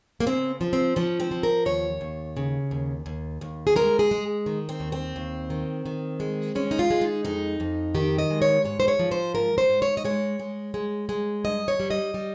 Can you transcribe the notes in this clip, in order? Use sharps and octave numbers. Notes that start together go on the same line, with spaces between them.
A#3
C#3 C4
F3
C4
F3 C#4
C4
F3
A#4
D#2 C#5
D#2
C#3
D#2
D#2
D#2
G#4
G#3 A#4
G#4
G#3
D#3
C4
D#2
C4
D#2
D#3
D#3
G#3
G#3 C#4
D#4
F4
G#3
D#4
F2 D#4
F2
D#3 G4
D#5
G#3
C#5
G#2 C#5
C5
C#5
F3
C5
G#2 A#4
C5
G#2
C#5
D#5
G#3 C#5
G#3
G#3
G#3
G2 D#5
C#5
G3
D#5
G3